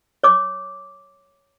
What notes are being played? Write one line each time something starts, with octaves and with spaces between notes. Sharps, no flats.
C#5 D6